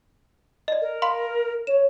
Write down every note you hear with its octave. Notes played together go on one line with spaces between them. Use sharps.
D5 D#5
A#4
F5 B5 C6
C#5 E7